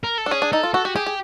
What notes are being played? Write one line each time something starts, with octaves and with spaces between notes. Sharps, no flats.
A#4
A4
D4
C#4 G#4
D4
D#4 A4
F4
F#4 A4
F#4 G4
G4 G#4
G#4